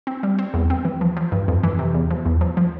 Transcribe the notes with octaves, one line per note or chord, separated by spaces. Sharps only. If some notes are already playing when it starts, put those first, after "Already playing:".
C4
G3
C4
E2
C4
E3
F3
F3
G2
F2
E3
C3
E2
F3
E2
F3
F3